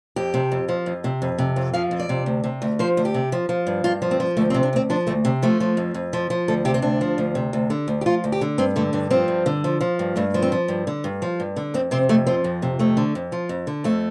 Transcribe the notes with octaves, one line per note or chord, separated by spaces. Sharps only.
F2 G4
C3
F2
F3
F2
C3
F2
C3
F2
F3 F5
F2
D5
C3
D2
C3
D2
F3 C5
D2
G4
C3
F3
F3
G2
G2 F4
F3
C4
F3
D2 A3
C4
C3
D4
D2 C4
F3 D4
D2 A3
C3
F3 A3
F3
F2
F2
F3
F3
D2 A4
C3 G4
C4
D2 D4
F3
D2
C3
D2
D3
D2
G4
F3 F4
D2
G4
D3
G2 C4
D3 A3
G2 D4
F3 C4
G2
D3
F3
F3
G2
G2 A3
F3
C4
F3
G2
D3
G2
F3
G2
D3
F2 C4
C3 C4
F2 A3
F3 C4
F2
C3
F2 A3
D3
F2
F3
F2
D3
F2 A3